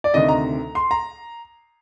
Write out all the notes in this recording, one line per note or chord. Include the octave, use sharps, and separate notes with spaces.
D5
D2 C3 D#3 D#5
A#5
C6
A#5